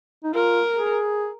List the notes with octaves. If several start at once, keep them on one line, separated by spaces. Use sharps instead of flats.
D#4
F4 A#4
G#4